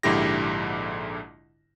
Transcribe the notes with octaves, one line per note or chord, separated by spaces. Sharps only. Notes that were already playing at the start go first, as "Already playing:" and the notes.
A#1 G#2 D3 E4 G4 A#6